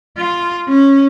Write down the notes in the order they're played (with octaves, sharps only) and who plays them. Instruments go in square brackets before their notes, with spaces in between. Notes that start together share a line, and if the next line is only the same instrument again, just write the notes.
[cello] F4
C#4